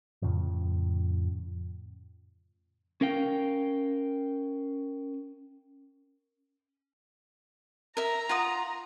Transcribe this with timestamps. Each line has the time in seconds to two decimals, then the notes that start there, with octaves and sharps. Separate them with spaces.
0.22 F2 A2 C#3 F3
3.01 C#4 A#4 F5 G5
7.97 A#4 E5 A#5
8.29 F4 F#5 D#6